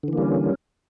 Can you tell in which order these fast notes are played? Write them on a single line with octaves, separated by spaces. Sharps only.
D3 E3 A#3 G3 C#4